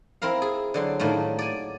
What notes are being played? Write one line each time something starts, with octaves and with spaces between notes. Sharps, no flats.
C4 E4 A#4 F5
G#4
D3 F#3 C6
A2 D#3 A3 A#3
D5 G#5